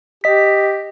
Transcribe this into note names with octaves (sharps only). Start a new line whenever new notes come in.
G4 D#5 B6